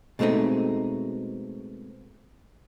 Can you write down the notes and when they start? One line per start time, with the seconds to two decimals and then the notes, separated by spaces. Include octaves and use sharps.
0.19 B2 G#3 A3 C4 D#4